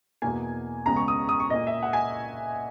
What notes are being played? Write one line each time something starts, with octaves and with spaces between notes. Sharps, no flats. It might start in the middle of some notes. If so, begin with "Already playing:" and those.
E2 B2 A#3 G#5
C#2 C#3 G#3 B3 A#5
C#6
D#6
D#6
C#6
A#2 A#3 D#5
E5
F#5
G#5